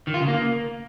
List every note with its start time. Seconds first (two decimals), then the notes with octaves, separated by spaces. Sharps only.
0.07 D#3
0.14 F4
0.21 C#3
0.28 A#3